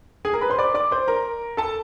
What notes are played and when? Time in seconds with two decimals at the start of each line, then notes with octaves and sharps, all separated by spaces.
0.25 G#4 G#5
0.33 A#4 A#5
0.41 B4 B5
0.50 C5 C6
0.58 D5 D6
0.74 D5 D6
0.91 C5 C6
1.08 A#4 A#5
1.57 A4 A5